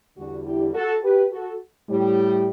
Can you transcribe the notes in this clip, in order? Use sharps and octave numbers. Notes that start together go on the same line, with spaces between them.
E2 D3 G3 D4 F#4
E4 G4
F#4 A4
G4 B4
F#4 A4
A2 G3